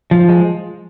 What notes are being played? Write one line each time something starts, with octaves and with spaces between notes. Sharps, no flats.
F3
G#3